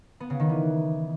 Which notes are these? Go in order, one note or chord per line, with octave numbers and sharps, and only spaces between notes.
B3
C#3
D#3
E3